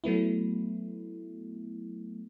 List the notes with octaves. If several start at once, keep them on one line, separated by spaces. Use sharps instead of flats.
F#3 A3 B3 E4